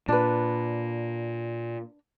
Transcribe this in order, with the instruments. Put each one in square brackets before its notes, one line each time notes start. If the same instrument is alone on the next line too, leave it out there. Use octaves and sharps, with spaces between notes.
[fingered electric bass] A#2 [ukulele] D4 B4